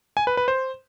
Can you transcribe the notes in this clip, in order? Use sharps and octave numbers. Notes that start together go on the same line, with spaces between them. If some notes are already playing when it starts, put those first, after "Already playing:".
G#5
B4
B4
C5